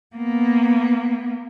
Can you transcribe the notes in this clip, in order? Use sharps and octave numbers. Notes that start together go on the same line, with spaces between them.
A#3 B3